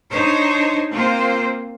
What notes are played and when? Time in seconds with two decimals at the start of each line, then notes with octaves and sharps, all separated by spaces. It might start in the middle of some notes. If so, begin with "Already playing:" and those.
0.11 D4 D#4 C5 C#5
0.91 A#3 C4 F4 C5